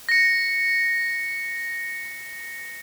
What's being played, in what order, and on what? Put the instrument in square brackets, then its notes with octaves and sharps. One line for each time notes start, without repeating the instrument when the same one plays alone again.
[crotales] A#6 C#7